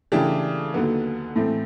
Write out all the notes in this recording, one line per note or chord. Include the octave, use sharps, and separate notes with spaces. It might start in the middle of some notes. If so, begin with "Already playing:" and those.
C#3 E3 A3 D4 G4
D#2 D3 F#3 B3
A2 E3 A3 C4